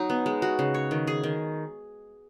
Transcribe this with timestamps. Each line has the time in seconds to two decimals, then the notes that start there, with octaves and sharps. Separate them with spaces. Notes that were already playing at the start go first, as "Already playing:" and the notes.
Already playing: F#3 D#4
0.10 B3
0.26 G#3
0.42 F#4
0.59 C#3
0.74 C#5
0.91 D#3
1.07 G#4
1.24 D#3